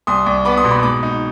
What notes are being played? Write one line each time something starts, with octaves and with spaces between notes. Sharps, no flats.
C2 C6 D#6
C2
B3 B5 D6
C6 D#6
B2
B5 D6
D#6
G#2 B5 D6
D#4